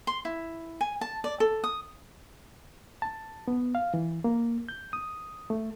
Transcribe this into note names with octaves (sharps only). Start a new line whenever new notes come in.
C6
E4
G#5
A5
D5
A4
D#6
A5
B3
F5
E3
A#3
G6
D#6
A3